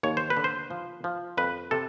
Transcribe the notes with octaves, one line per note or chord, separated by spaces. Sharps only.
D#2 C#5
C5
B4
D3
C5
F3
F3
F2 B4
C3 A4